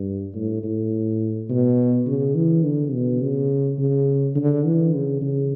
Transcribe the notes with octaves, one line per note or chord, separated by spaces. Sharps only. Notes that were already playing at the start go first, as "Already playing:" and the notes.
Already playing: G2
A2
A2
B2
C#3
E3
D3
B2
C#3
C#3
D3
E3
C#3
C#3